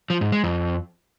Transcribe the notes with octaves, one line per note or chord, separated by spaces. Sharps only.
F3
G#2
G#3
F2